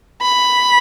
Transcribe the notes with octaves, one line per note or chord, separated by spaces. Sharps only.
B5